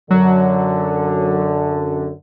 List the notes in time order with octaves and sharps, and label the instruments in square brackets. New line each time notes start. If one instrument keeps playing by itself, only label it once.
[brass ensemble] F#2 D3 [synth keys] F#3